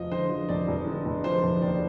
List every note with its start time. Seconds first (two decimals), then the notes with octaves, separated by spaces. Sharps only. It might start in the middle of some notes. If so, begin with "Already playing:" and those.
Already playing: F1 F3 D#5
0.11 D3 C5
0.30 F3
0.49 F1 D5
0.68 F1
0.86 D3
1.05 F1
1.24 F3 C5
1.43 F1
1.61 D#2 D5